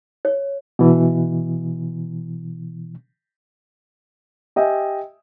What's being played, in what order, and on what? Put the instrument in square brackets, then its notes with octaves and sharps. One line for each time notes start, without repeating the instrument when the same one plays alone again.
[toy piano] C#5
[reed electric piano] B2 E3
[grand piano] G4 D#5 E5 G5 G#5